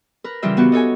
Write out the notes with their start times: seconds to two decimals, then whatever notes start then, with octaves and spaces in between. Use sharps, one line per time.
0.24 A#4 B4
0.42 C#3 E3 G3 F4 G4 E5
0.57 B3 F#4 G4
0.72 D#4 A4 C#5 G#5